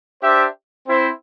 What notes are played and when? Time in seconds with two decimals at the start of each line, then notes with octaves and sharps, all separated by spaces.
0.21 D4 G4 C5 E5
0.85 C4 E4 C5